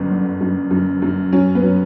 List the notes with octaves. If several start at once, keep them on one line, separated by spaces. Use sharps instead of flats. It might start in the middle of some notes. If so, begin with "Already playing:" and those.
Already playing: G1 F#2
D3
F#2
F#2
F#2
F#3 C#4
B3
F#3